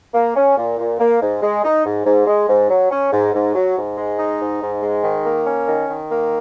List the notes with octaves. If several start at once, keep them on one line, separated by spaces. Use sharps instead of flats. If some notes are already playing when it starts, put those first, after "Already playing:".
A#3
C#4
A#2
A#2
A#3
G#2
G#3
D#4
G#2
G#2
G#3
G#2
F#3
C#4
G#2
G#2
F#3
G#2
G#3
D#4
G#2
G#2
G#3
D#3
A#3
C#4
D#3
D#3
A#3